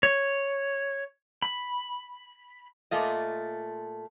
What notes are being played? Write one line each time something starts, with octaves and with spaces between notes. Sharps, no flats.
C#5
B5
A#2 A3 F4 D#5